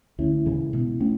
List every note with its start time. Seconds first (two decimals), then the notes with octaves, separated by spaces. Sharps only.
0.19 D2 C#4 E4
0.46 C#3 E3 G#3
0.73 B2
1.00 A3 C#4